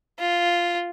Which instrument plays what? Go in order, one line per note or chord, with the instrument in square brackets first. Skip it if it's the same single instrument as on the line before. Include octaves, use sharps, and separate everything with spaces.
[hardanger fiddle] F4